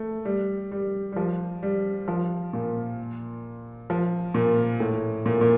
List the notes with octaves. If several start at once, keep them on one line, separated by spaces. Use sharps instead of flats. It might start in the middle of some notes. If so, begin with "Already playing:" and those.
Already playing: A3
G3
G3
G3
F3
G3
F3
A#2
F3
A#2
A2
A#2
A#2